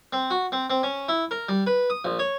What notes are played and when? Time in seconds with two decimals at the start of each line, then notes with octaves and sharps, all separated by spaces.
0.13 C4
0.30 F#4
0.52 C4
0.70 C4
0.83 C#4
1.09 E4
1.31 A#4
1.49 G3
1.67 B4
1.90 D#6
2.05 A#1
2.19 C#5